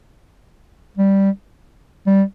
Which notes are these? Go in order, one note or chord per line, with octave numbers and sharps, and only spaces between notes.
G3
G3